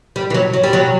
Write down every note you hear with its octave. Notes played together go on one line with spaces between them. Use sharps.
G3
E3
F#3
F#3
G3
F#3